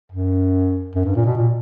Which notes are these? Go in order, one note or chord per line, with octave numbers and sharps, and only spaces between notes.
F#2
F#2
G2
A#2
B2
A#2